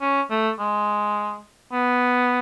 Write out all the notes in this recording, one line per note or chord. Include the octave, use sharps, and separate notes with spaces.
C#4
A3
G#3
B3